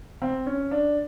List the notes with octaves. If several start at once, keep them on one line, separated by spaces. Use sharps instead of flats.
C4
C#4
D4